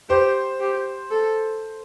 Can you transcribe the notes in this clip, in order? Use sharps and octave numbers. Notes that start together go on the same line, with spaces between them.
G4 C5
G4
A4